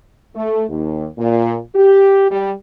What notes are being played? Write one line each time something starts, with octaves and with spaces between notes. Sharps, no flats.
A3
D#2
A#2
G4
G3